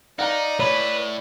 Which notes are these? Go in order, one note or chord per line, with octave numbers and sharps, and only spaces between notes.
D#4 D5 F5 F#5 A#5
A2 B4 C#5 B5